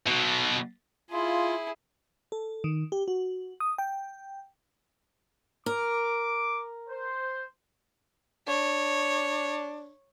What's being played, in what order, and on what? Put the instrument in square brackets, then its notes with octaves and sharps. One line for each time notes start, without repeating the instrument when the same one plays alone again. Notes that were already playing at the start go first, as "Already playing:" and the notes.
[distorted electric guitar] B2 F#3
[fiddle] E4 G#4 [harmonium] F4
[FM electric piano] A4
D#3
G4
F#4
D#6
G5
[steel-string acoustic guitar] A#4 [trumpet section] D6
[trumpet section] C5
[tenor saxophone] D4 [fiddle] C#5